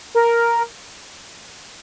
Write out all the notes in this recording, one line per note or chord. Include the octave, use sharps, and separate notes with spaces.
A#4